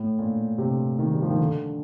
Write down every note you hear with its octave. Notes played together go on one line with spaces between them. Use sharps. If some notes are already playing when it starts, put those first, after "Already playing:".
Already playing: A2
A#2
C3
D#3
G3
F3
D#3
D3